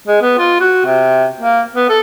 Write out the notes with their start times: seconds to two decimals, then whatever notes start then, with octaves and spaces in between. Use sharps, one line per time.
0.08 G#3
0.22 B3
0.38 F4
0.61 F#4
0.86 C3
1.40 A#3
1.75 B3
1.89 A4